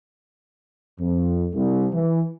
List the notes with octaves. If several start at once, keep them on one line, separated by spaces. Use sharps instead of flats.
F2
C2
E3